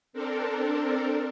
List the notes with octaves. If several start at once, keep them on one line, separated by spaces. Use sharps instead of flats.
C4 D4 A4 A#4